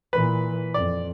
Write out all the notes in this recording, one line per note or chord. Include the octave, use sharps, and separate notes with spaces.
A#2 E3 B4
F2 D5